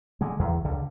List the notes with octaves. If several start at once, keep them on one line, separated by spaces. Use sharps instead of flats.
D3 G#3
E2
C#2 D3